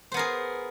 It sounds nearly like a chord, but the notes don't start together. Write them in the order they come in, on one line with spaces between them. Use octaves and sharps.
C5 B3 A#4 G#4